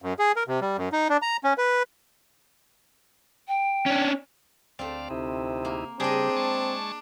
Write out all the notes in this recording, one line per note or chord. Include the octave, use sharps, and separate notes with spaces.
F#2
G#4
A#4
C3
G3
F#2
D#4
D4
A#5
C#4
B4
G5
C#4 D4
D2 A3 C4 D5 F5
D2 C3 D#4 E4
A#3
C#3 G3 C4 D4 G4 G#4 D#5
G#3 A5 C#6